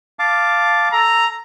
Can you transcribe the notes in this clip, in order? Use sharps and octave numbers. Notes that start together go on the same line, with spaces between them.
F5 A5 D6
A4 A#5